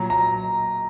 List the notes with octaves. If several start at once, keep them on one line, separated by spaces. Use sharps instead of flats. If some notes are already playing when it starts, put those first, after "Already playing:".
Already playing: A#2 F#3 A#5
A#5